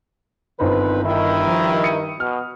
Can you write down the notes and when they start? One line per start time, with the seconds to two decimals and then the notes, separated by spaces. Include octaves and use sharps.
0.60 G1 D#3 C4 D#4 B4 C5
1.04 G2 D#3 E4
1.47 F3
1.83 D#6 C#7 D#7
2.20 B2 F6